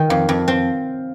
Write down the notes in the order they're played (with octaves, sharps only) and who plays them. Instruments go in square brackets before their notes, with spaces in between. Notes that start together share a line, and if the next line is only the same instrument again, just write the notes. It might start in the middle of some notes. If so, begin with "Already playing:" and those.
Already playing: [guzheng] D#3 [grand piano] G5
[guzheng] F2 [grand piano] F5
[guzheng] F2
C4